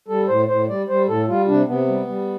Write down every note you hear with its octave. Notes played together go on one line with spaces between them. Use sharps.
G3 A4
A2 C5
A2 C5
G3 D5
G3 C5
A2 A4
G3 F4
C3 D4
C3 B3
G3
G3